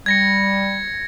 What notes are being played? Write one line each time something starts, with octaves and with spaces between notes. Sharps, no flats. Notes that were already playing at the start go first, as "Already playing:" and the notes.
G3 G#6 A#6 C#7